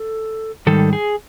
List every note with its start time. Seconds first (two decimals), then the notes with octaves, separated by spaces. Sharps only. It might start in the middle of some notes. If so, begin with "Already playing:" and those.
Already playing: A4
0.67 G#2 D#3 G3 A4
0.93 G#4